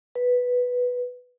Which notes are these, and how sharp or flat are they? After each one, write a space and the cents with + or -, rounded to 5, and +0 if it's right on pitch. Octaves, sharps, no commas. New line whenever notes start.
B4 +0